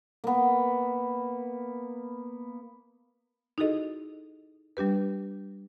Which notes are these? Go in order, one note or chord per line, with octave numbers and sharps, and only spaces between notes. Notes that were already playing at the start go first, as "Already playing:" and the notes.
A#3 B3
D#4 E4 F#4 G#4 A4 D#5
G3 D4 G4 B4